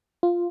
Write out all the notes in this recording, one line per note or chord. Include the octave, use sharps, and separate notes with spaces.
F4